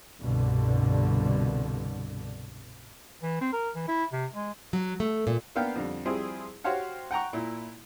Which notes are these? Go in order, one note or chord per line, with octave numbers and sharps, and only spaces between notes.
C2 G2 B2 D3
E3
C4
A#4
E3
E4
C3
G#3
F#3
A3
A#2
A#3 B3 D4 F5 G5
F2 D3 G3
F3 G3 C4 E4 G#4 C5
F#4 G4 C5 C#5 F5 F#5
F#5 G5 A#5 C#6
A#2 E4